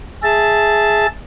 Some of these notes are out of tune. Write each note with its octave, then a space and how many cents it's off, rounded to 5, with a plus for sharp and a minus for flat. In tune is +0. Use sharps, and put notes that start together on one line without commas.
G#4 +5 E5 +0 A5 +0